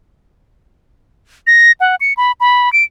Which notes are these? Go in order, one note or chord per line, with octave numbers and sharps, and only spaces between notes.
A#6
F#5
C#7
B5
B5
D7